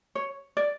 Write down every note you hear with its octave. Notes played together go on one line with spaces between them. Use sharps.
C#5
D5